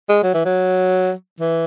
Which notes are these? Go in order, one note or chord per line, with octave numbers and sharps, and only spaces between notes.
G#3
F#3
E3
F#3
E3